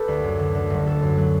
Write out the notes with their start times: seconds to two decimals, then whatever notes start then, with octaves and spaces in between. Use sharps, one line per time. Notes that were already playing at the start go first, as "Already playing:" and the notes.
Already playing: G4 A4 B4
0.08 D2
0.23 F#2
0.39 D3
0.55 D3
0.70 G1
0.86 G1 A4
1.02 F#2
1.17 F#3